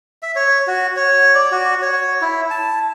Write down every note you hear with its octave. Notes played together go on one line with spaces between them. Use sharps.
E5
C#5
F#4
C#5
D5
F#4
C#5
E4
A5